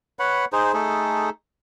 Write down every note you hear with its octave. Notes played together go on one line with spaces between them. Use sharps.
B4 C#5 F#5 B5
D#4 G#4 C5
A3 D#4 G#4 A4